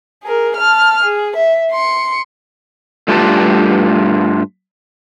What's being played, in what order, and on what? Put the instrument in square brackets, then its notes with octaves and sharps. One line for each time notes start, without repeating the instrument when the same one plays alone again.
[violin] G#4 A#4
A5 F6
G#4
E5
C6 C#7
[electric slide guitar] G2 A3 F4 G4 B4 A5